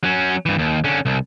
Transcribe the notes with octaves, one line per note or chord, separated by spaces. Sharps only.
F#3 C#4
G2 E3
D#2
D3 C#4
C2